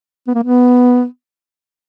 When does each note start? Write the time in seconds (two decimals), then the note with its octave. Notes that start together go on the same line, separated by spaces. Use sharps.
0.27 B3
0.35 A#3
0.43 B3